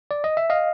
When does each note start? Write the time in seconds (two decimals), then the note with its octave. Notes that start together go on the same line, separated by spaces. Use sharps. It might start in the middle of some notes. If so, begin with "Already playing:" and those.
0.11 D5
0.24 D#5
0.37 E5
0.50 D#5 F5